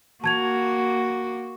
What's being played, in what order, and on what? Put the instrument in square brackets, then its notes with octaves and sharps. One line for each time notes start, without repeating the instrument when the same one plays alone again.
[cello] A#3 F#4 [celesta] A5 G#6 F7